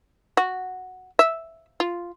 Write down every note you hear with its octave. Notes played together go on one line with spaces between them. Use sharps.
F#4
E5
F4